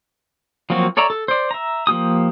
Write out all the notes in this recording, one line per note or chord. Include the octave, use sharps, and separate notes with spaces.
F3 F#3 A#3 C4 F#4
A4 C#5 D5 E5 A#5
A4
C5 D5
E5 A#5
F3 A#3 G4 D#6